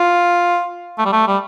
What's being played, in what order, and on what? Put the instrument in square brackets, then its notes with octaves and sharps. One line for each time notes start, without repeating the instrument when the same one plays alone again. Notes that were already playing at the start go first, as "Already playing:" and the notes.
Already playing: [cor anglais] F4
A3
G3
A3
G3